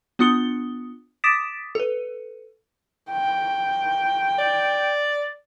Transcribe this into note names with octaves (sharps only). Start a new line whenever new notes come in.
B3 D4 F4 D#6 C#7 G7
D6 D#6 A6 B6 D7 E7
A4 B4
G5
D5